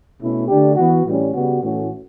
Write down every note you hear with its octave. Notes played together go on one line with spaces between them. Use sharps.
B2 A3 C#4 E4
D3 A3 D4 G4
E3 B3 F#4
A2 E3 G3 C#4
C#3 G3 B3 F#4
A2 E3 A3 C#4 F#4